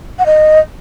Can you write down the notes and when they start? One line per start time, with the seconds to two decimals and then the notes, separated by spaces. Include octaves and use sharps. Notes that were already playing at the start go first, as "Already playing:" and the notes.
0.19 F#5
0.26 D#5